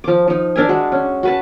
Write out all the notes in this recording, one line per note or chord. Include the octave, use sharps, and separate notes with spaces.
F3 D6
F3 D#4
D4 A#4 E5 G#5
G#3 F#4
C#4
F#4 B4 A5